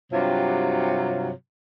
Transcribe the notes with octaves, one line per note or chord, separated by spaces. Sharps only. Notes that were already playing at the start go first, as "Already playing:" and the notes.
G2 C3 F#3 F4